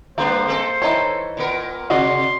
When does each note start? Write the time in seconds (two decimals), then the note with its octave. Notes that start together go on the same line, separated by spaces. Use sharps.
0.18 G3 A#3 B3 D4 C5
0.45 G#3 C4 A4
0.82 E3 D#4 A4 C#5
1.37 A#2 B3 A#4
1.90 C3 F#4 D5 D#5 C6